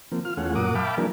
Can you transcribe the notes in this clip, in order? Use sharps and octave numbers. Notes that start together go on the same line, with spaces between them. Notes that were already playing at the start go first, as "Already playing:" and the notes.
F3 A#3 C4
F4 F6
E2 A3 C#4 F4 G#4 F#5
F#2 A#2 A#4 F#5 D6 D#6
E5 F5 G5 A5 B5 D6
E3 F#3 A#3 D4 G#4 A#4